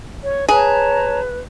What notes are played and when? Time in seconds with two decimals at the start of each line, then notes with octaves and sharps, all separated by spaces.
0.24 C#5
0.48 G#4 B4 C#5 A5 A#5